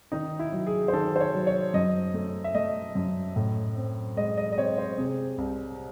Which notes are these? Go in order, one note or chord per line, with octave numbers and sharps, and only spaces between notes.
D#3 D#4
E4
F#3
G#4
C5
D#3 A4
C5
C#5
F#3
C#5
F#2 D#5
A3
E5
A3 D#5
F#2
A2
C4
G#3 D#5
D#5
D#5
C4 C#5
C5
C3 G#4
C2